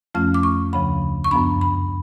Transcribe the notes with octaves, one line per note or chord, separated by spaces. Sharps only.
F2 F3 A3 C#4 F6
D6
C#6
D2 C#3 F3 B5
C#6
F#2 F3 B3 D4 B5
B5